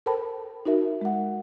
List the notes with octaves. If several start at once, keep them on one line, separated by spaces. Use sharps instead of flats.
A4 A#4 C5 G5 A5 B5
D#4 F#4 A#4 E5
G#3 F#5